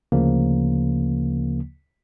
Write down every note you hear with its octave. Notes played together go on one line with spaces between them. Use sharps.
D2 C#3 F3 A#3